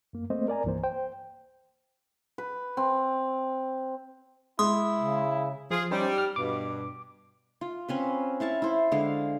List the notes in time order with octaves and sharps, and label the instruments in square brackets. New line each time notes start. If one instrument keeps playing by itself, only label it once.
[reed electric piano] F#2 A#3
A3 A#3 C4 C5 D#5
A#4 D5 G#5 A#5
C2 G2 E3 A#3 C5
C5 G5
[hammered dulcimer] B4
C4
[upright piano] G#3 [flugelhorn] E4 [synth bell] C6 D#6
[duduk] C#3
[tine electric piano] F3 [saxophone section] F4 G#4
[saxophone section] G3 [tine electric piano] C#4 D#4 C5
[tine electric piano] F6
[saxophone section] G2 B2 [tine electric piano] D6
[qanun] F4
C4 C#4 B4
E4 F5 A5 C#6
E4 C5
D3 G#3 F5